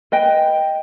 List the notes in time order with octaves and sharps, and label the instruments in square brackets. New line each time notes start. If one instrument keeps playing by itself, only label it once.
[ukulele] B4 D#5 G5